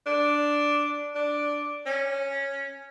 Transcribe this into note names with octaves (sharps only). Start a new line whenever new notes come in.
D4
D4
C#4